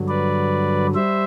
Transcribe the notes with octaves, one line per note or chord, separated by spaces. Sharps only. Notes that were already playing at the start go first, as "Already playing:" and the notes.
Already playing: G2 D3 F#3
B4 D5
G3 C5 E5